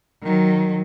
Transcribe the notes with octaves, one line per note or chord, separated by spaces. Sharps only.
D#3 F#3